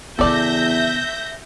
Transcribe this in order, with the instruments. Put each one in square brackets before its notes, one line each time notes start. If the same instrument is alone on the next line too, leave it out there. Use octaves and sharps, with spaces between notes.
[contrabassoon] E2 [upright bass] C#3 B3 [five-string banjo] A4 D5 [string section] E5 G6 A#6